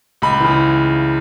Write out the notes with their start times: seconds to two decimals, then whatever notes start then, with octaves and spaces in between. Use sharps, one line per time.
0.22 C#2 B5
0.40 C#3 E3